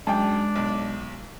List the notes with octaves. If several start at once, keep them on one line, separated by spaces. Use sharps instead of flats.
F#2 G#3 D4 G5 A5
B1